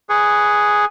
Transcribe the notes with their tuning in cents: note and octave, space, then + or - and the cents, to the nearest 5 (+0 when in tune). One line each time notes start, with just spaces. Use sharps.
G#4 +0 B4 +0 C#6 +0